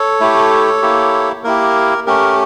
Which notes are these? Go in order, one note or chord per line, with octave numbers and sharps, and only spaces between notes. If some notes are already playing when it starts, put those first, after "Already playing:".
Already playing: A4 C#5
A3 E4 G4
A#3 E4 G4
A#3 E4 G4 A#4
A3 C#4 G4 A#4